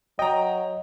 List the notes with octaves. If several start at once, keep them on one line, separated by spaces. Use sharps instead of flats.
F#3 D#5 G5 A#5